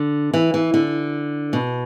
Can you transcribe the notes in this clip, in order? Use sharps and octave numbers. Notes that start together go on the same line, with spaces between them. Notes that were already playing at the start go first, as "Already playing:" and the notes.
Already playing: D3
E3
E3
D3
B2